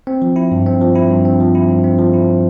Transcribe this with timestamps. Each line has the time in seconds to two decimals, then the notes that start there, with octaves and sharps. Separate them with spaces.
0.07 C4
0.22 F3
0.36 E4
0.52 G2
0.66 C4
0.81 F3
0.95 E4
1.10 G2
1.25 C4
1.40 F3
1.55 E4
1.69 G2
1.84 C4
1.99 F3
2.14 E4